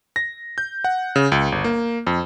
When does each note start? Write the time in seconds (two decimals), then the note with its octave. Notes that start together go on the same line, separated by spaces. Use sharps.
0.16 A#6
0.58 G6
0.84 F#5
1.16 C#3
1.32 C#2
1.52 G1
1.64 A#3
2.07 F2